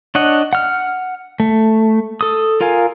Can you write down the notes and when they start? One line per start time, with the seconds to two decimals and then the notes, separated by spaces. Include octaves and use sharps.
0.15 D4 C#5 D#5 F#5
0.53 F#5 F6
1.40 A3
2.21 A4 D#6
2.61 F4 A#4 F5 G#5